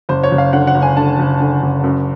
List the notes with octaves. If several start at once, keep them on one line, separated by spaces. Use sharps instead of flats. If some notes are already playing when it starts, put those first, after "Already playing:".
F#1 C5
C#5
F#1
F5
D3 F#5
F#5
F#1
G#5
D3 A5
F#1
D3
F#1
F#2